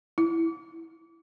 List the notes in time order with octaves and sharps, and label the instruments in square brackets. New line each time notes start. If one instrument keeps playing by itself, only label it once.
[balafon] E4